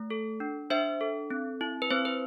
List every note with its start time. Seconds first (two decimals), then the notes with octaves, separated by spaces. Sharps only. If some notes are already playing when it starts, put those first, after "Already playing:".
Already playing: A3
0.10 A4
0.40 D4
0.70 D4 C5 E5
1.01 A4
1.31 C4
1.61 E4
1.82 B4
1.91 C4 C5
2.05 B4